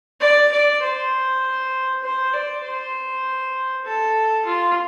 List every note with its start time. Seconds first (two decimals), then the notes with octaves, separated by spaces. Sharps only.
0.21 D5
0.52 D5
0.82 C5
2.03 C5
2.33 D5
2.65 C5
3.85 A4
4.46 F4